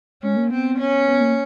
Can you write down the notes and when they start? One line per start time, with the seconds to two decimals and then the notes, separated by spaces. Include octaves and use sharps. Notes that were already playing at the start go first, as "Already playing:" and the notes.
0.22 G#3 C#4
0.36 A#3
0.50 B3 C4
0.79 C#4
1.07 B3
1.20 A#3